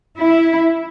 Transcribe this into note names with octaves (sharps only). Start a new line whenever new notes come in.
E4